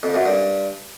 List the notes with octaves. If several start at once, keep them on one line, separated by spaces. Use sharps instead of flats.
F2
F#2
G2